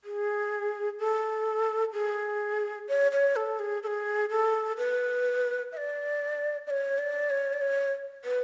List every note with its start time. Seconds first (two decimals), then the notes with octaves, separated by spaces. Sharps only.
0.04 G#4
0.99 A4
1.93 G#4
2.89 C#5
3.12 C#5
3.36 A4
3.59 G#4
3.83 A4
3.87 G#4
4.30 A4
4.78 B4
5.72 E5
5.77 D5
6.67 D5
6.70 C#5
6.98 D5
7.30 C#5
7.53 D5
7.61 C#5
8.25 B4